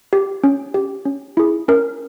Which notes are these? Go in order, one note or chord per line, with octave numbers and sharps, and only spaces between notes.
G4
C#4
G4
C#4
E4 G#4
C#4 A#4